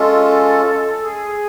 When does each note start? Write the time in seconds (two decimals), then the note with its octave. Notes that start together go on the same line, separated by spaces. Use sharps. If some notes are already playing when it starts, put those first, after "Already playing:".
Already playing: G#3 C#4 F4 A4
1.01 G#4